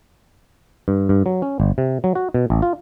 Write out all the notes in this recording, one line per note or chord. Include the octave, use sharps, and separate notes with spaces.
G2
G2
F#3
C#4
G1
C3
F#3
F#4
B2
A1
F4